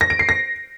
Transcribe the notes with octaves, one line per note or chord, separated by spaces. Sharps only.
A#6
D7
C7
A#6